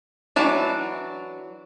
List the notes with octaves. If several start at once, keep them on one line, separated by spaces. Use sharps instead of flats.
E3 F#3 D4